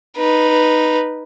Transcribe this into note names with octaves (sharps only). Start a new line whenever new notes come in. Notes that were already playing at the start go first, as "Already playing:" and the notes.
D#4 B4